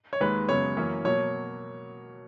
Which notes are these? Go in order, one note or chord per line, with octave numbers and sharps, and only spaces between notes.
C#5
D#2 D#3 G#3 B4
F#2 C#3 G#3 B3 C#5
F#2 E3 A#3 C#4
B2 F#3 A#3 C#5